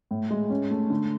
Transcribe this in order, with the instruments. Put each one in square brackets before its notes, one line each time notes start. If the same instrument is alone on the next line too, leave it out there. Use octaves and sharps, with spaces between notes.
[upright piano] A2
G#3
C#4
A3
D3